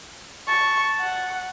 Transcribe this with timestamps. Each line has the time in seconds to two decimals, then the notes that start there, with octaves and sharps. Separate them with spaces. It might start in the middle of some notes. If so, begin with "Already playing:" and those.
0.48 A5 C#6
1.02 F#5